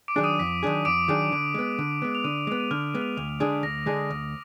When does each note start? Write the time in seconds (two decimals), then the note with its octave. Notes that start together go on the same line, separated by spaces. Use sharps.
0.08 D6 D7
0.16 D#3 F#3 D4 G#4
0.24 D#6 D#7
0.39 F2 B6
0.63 D#3 F#3 D4 G#4
0.85 F2 D6 D7
1.08 D#3 F#3 D4 G#4
1.32 D3
1.54 G#3 B3
1.79 D3
2.02 G#3 B3
2.15 F7
2.24 D3 D#6 D#7
2.47 G#3 B3
2.60 D#7
2.71 D3 F6 F7
2.94 G#3 B3
3.01 F6 F7
3.17 D2 F6 F7
3.29 F6 F7
3.40 D3 G#3 D4 G#4 D#6 D#7
3.52 B6
3.63 D2 A#6
3.86 D3 G#3 D4 G#4
4.10 D2